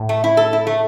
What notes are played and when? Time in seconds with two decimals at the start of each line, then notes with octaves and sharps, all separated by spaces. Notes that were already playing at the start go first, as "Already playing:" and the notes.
Already playing: A2
0.09 A3
0.24 E4
0.37 A4
0.53 E4
0.67 A3